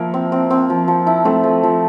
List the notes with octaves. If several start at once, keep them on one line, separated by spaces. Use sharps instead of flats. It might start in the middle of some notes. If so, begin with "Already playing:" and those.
Already playing: F3 A#3 E4 A#4
C4
C4
C4
F3
F3
E4
A3 C4 A4
F3
F3